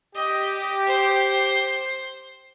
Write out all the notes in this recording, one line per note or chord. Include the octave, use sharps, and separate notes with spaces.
G4 D#5
C5